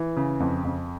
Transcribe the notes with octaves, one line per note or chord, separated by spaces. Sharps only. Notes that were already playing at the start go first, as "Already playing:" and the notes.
Already playing: E3
C#3
F2
F2